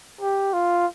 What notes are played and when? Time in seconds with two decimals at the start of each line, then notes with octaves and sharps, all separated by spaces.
0.21 G4
0.53 F4